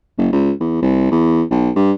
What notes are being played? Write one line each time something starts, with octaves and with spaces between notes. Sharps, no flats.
F#1
C#2
E2
C2
E2
B1
G2